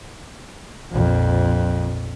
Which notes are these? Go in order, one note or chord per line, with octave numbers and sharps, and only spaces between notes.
A#1 F2